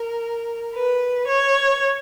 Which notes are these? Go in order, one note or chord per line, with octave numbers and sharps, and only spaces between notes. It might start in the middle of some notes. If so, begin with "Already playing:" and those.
Already playing: A#4
B4
C#5